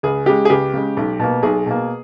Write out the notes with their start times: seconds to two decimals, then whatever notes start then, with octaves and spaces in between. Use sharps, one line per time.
0.03 C#2 G#4
0.26 C#3 G#3 G4
0.45 G#4
0.50 C#2 G4
0.74 C#3 G#3
0.97 B1
1.19 B2 A#3
1.43 B1 G#4
1.66 B2 A#3